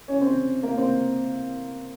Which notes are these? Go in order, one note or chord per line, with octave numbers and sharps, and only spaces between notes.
C#4
C4
A#3
C4